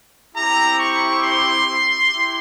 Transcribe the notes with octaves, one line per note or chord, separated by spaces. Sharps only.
C4 E4 G4 A#5
C#6
C6
E4 G4